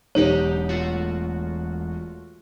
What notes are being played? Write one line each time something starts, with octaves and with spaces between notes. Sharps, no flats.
E1 F#3 D#4 G4 C#5
A3 F4 F#4